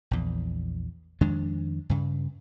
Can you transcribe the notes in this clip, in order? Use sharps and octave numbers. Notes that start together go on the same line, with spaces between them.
A#1 E2
F2 D#3 G#3 D4
G2 C#3